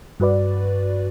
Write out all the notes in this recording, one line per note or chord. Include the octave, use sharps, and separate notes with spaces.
G2 F#4 B4 D5